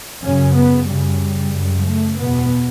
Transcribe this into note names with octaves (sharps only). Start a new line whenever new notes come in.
F#2 C#3 C#4
B3
F#2 C#3 G3
F#2 C#3
A3
E2 B2 B3